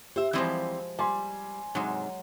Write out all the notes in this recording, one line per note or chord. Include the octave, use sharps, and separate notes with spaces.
G4 C5 E5
E3 F3 G3 G#3 C4 E4
G3 G#5 C6
G#2 C3 F#3 G#3